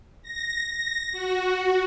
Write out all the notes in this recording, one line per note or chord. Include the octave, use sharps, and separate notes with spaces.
A#6
A#6
F#4